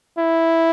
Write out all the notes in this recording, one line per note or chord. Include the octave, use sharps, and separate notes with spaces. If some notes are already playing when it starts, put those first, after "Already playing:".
E4